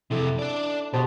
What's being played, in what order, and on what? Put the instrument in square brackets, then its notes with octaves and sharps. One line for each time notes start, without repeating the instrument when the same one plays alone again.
[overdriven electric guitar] F2 C3 [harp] E4 A4
[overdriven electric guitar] D4 D5
[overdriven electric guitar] B2 [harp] G4 C5 A5